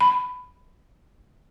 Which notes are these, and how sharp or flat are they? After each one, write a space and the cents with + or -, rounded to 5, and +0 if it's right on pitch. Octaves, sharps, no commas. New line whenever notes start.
B5 +15